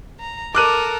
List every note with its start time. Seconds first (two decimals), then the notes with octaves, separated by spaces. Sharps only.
0.20 A#5
0.55 A4 A#4 D6 F#6 D#7